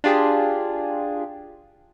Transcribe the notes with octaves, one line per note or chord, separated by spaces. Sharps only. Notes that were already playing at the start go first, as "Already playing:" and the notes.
D4 F4 G4 G#4